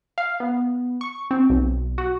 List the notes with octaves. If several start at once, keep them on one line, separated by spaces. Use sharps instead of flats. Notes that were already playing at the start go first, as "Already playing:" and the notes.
F5
B3
C#6
C4
B1
F#4